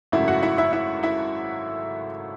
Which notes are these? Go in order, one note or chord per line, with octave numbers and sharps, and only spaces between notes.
G#1 F#2 C#3 F#3 A3 E4 E5
F#4 F#5
E4 E5
E4 E5
E4 E5
E4 E5